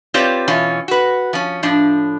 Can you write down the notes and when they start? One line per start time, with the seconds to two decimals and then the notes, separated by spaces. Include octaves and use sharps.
0.14 C4 F4 G4 B4 C#5 D5
0.48 B2 E3 C#4 F4
0.88 F#4 B4
1.33 F3 C#4
1.63 A2 F3 D4